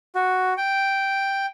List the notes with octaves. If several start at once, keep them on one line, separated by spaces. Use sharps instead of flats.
F#4
G5